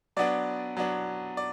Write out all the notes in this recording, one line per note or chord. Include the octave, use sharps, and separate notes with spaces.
F#3 B3 D4 D5
F#3 B3 D4
D5